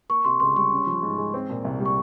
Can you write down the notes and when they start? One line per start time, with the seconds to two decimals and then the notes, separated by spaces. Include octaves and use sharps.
0.09 A#3 C#6
0.24 C3 C6
0.40 C#2 C6
0.56 G3 C#6
0.71 C#4
0.87 F3
1.03 G#2
1.18 G#3
1.34 C4
1.50 A#2
1.65 C2
1.80 G3
1.86 C#6